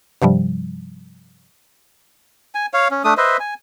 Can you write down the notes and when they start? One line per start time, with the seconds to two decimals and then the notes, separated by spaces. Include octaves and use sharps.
0.22 G2 C3 F3 G3
2.55 G#5
2.74 C#5 F5
2.91 C#4
3.04 A3 D4 D#6
3.18 B4 C5 D#5 E5
3.40 G#5